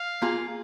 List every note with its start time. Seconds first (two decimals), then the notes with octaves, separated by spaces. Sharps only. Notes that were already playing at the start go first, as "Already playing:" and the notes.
Already playing: F5
0.22 A#3 F4 G#4